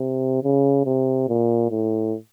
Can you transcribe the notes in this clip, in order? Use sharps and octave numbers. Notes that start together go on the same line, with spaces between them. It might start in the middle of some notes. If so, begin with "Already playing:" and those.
Already playing: C3
C#3
C3
A#2
A2